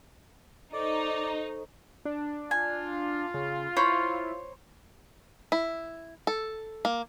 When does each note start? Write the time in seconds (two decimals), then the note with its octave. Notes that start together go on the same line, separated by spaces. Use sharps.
0.73 D#4 A4 C5 D5 C#6
2.05 D4
2.51 F4 G#5
3.34 C#3
3.77 E4 C5 C#5 B5
5.52 E4
6.27 A4
6.85 A#3